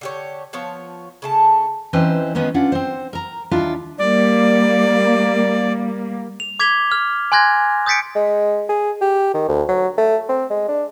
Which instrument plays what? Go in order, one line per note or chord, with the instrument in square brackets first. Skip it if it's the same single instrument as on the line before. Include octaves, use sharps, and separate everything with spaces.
[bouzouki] D3 G4 C#5
F3 B3 C#5
C#3 A3 A5
[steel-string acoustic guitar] E3 C4 C#4 D#4 B4 C5
D#3 G#3 A#3 B3 C#4
C#4 D4 F4 F#5
C4 C5
A#4 A#5
D#2 D4 E4 F4 F5
[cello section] G3 A#3 [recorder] D5
[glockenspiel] F7
D6 G#6 B6 F7 G7
F6
G#5 C6 F#6 G#6 A#6
D#6 G6 A6 B6 C#7 D7
[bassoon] G#3
G#4
G4
D#3
D2
F#3
A3
C4
G#3
D4